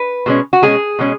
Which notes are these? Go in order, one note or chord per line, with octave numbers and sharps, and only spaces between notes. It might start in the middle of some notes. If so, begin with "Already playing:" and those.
Already playing: B4
B2 G#3 C#4
F#4
B2 G#3 C#4 G#4
B2 G#3 C#4